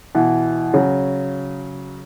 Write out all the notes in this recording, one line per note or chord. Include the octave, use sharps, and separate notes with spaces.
B2 E3
C#3 F#3